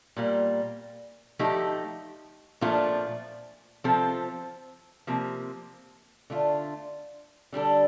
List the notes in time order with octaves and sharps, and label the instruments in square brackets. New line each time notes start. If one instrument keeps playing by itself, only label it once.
[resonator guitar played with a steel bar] A#2 G3 A#3
F3 A3 D#4 G4
A#2 F3 A3 D4 F4
C3 F3 C4 F4 A4
C3 F3 A#3
D3 A3 D4 F4
D3 G3 D4 A4